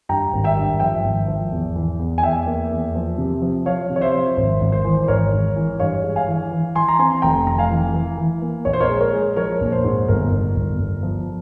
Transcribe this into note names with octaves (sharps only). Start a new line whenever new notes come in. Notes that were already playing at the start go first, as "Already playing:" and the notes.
G2 G5 A#5
G#1
E5 G5
G2
F3 E5 G5
G#1
F3
E2
E3
E2
G#5
E2 E5 G5
A#3
E2
F3
C3
F3
F3 C#5 F5
C3
C#5
C5 E5
F3
G#1 C5
G#1
C5
E3
C5
G#1 A#4 C#5
G#2
E3
G2 C#5 F5
G#3
F5 G#5
E3
E3
E3 G#5 C6
A#5
C4 G#5 C6
F1 G5 A#5
F1 A#5
F5 G#5
E3
E3
E3
A#3
A#1 C#5
C5
A#4 C#5
G#3
A#4 C#5
G#3
F3 A#4 C#5
A#1
C5
G#2
G1 A#4
G1
G1
G1
F3